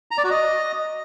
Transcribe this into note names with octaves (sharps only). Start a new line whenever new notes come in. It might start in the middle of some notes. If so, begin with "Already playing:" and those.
A#5
D5
F#4
D#5